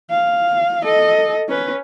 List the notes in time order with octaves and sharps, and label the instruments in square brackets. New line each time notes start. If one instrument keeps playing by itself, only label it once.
[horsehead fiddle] F5
A4 D#5
C#4 B4